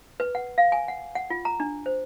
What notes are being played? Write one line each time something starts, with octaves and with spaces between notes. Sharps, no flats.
B4
F#5
F5
G#5
F#5
F#5
F4
A#5
D4
C5